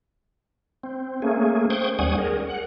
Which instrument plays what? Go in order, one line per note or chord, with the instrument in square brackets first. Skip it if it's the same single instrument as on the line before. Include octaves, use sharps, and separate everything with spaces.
[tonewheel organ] C4
A3 A#3 C#4 G#4
C5 G5 C#6 D#6
D#2 G3 C#4 F#5 G#5 D#6
G#4 A#4
F#5